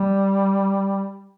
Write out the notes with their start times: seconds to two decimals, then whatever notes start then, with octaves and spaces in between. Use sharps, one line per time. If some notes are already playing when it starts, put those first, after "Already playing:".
Already playing: G3